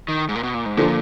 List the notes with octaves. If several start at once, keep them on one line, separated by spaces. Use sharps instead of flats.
D#3
G#2
A#2
B2
A#2
G#2
A#2 D3 F3